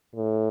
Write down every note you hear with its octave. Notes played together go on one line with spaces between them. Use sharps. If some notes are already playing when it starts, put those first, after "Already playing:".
A2